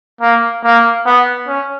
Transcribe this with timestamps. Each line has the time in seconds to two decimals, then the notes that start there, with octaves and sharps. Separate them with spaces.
0.21 A#3
0.64 A#3
1.06 B3
1.48 C#4